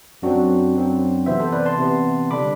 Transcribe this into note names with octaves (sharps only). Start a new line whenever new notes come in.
F#2 F#3 C4 D4 F#4
F#2 F#3 C4
C3 E3 B3 C5 E5
A4 C5
B4 D5
A5 C6
C3 E3 B3
D3 G3 D4 B5 D6